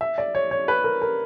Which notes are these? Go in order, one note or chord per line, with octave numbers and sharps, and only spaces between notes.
E5
D5
C#5
C#5
B4
A#4
A#4